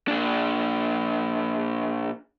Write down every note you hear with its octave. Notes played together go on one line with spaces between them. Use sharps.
A#2 D4